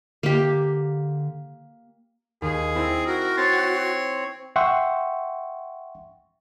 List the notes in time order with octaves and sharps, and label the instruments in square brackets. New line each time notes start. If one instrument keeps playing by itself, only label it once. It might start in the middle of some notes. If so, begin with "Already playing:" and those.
[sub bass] D3 [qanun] A#3 G4
[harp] D#2 [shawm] G#4
[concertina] C4 [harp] E4
[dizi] F#4 [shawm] A#4
[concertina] C4 C#5 [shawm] C6 [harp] A6
[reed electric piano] E5 F#5 G5 C6 C#6